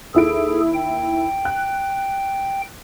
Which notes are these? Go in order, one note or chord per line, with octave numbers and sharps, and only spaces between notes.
D#2 E4 G#4 A4 D7
G5
F#6